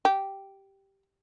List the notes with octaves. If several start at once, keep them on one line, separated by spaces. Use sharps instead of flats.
G4